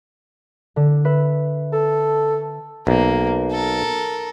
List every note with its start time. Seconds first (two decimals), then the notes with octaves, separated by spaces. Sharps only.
0.76 D3
1.05 B4 E5
1.72 A4 A5
2.87 B1 A#3
3.52 A4 A#4